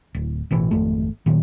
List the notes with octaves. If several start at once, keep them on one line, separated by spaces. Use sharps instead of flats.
D1
A1 B2 E3
G#1 F2 A3
A#2 D#3 F#3